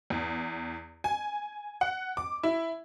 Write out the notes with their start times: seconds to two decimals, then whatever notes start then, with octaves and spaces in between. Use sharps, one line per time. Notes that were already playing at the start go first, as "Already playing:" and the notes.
0.10 E2
1.04 G#5
1.81 F#5
2.17 D6
2.43 E4